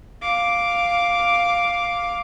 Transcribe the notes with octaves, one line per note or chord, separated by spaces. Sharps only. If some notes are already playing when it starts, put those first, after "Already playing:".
F5 D6